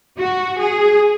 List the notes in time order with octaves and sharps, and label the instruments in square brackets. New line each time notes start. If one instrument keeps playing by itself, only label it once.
[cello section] F#4
G#4